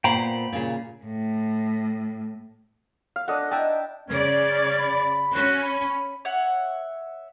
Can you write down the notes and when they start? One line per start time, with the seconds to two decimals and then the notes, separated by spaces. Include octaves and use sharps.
0.04 A#2 B3 C5 G5 A#5 B5
0.53 A#2 C#3
1.05 A2
3.16 F5
3.28 A3 D4 D#5 F#5
3.51 D#4 E4 D#5 E5 G5 A5
4.08 C#3 C#4 D5
4.79 B5
5.34 C#4 F#4
5.63 B5
6.25 C#5 E5 F#5